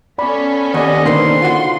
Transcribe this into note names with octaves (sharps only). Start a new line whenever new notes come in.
B3 C#4 A4 D5 B5
D#2 D5 D#5 F#5
D3 D#3 A#3 D#4 B4 C5 C6
F4 F#4